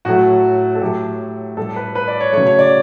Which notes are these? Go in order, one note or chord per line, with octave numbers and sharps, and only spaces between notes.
A2 F#3 A3 F#4
A4
A2 F#3 A3 G4
A2 G3 A4
B4
B4
D5
C#5
C#3 F#3 A3 C#5
C#5
D5